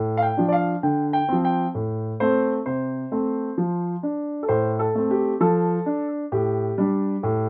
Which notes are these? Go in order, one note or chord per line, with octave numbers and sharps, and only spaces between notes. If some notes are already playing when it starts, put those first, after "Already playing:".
Already playing: A2
F5
G5
F3 D4
D5
F5
D3 G5
G5
F3 C4
G5
A2
A3 C4 C5
C3 C5
A3 C4
F3
D4
A4
A2 C5
A4
A3 C4
G4
F3 A4
D4
A2 G4
G3 D4
A2